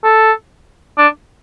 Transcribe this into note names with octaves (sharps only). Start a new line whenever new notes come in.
A4
D4